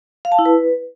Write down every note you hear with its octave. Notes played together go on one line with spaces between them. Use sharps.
F5
A5
E4
B4